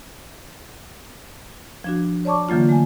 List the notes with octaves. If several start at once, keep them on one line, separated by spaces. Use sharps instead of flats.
F3 D4 F#4
C#5 D5 A5 C#6 D6
D3 E3 F#3 A#3 F4
A3 G#5